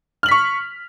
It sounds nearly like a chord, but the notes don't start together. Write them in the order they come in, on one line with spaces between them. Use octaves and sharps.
F6 F#7 B6 C#6